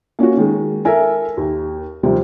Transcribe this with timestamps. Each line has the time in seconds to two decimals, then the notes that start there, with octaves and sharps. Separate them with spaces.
0.19 A#3 C#4 F4 F#4
0.37 D#3 G#3
0.85 A4 A#4 E5 G#5
1.37 D#2
2.03 D#2 C3 F3 G3 C4